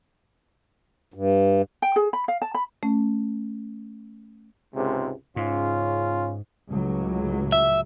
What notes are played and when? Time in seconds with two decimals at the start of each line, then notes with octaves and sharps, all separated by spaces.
1.14 G2
1.82 G5
1.96 G#4
2.13 B5
2.28 F5
2.42 A5
2.55 B5
2.83 A3 C#4
4.73 C#2 G#2 C3
5.36 G#2 C#3 C#4 F4
6.71 C#2 A2 F#3
7.52 E5